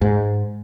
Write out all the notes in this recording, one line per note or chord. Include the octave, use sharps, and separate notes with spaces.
G#2